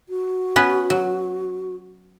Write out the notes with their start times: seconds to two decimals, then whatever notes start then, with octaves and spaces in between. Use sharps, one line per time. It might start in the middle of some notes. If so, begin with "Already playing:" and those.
0.09 F#4
0.56 B3 C#4 B4
0.90 F#3